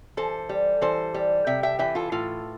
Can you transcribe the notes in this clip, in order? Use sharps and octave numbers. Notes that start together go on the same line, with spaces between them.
E3 A4 C5
G3
E3 A4 C5
G3
C3 E5 G5
E5 G5
E3 E5 G5
F4 A4
A2 F4 A4